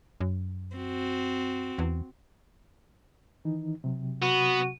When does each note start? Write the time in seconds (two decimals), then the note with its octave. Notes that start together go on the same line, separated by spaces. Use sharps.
0.21 F#2
0.76 C4 F#4
1.78 E2
3.45 D#3 E3 D#4
3.84 C3 F#3
4.22 B3 F#4